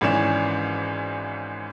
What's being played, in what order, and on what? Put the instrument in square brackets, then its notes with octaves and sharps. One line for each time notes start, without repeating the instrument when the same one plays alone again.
[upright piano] G#1 G#2 E3 C#4 D5 E7